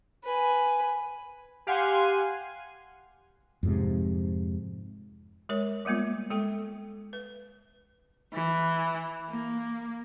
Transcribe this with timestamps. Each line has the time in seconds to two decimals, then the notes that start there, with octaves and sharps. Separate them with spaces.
0.24 B4 G#5
1.67 G4 F5 F#5 G#5 C6
3.63 F2 G#2 C3
5.49 G#3 A#4 C#5
5.85 G3 G#3 A#3 B3 F4
6.30 G#3 A4 G5
7.13 B4
8.34 E3
9.30 A#3